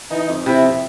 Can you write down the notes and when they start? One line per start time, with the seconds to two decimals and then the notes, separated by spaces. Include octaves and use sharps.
0.11 E3 D#4
0.29 F2
0.46 C3 E4
0.63 F2